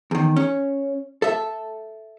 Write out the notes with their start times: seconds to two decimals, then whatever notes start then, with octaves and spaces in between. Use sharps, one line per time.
0.11 E2 D#3
0.36 C#4
1.22 A4 E5